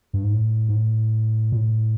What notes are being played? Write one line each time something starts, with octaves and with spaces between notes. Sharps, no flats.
G2
G#2
A2
G#2
A2
A#2
A2